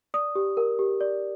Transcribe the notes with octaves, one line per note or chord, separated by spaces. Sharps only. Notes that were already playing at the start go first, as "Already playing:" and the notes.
D5 D#6
G4
A#4
G4
D5